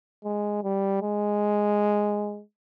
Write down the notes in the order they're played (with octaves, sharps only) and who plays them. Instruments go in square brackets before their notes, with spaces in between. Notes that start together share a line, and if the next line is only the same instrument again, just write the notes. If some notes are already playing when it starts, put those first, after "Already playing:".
[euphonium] G#3
G3
G#3